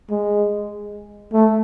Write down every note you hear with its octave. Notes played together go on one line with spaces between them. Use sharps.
G#3
A3